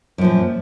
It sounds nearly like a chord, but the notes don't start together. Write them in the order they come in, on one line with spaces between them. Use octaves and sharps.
F#2 F3 A#2